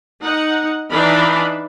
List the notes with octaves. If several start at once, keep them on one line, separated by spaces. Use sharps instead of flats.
D#4 F#5
E3 D4 D#4 F5 B5